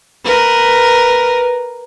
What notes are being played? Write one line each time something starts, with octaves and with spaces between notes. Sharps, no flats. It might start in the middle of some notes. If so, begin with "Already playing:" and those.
A#4 B4